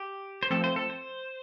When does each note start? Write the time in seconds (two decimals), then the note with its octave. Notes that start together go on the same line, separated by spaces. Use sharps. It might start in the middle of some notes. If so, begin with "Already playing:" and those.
Already playing: G4
0.43 C5
0.50 F3 A3 C4 A4
0.64 C5
0.76 A4
0.90 C5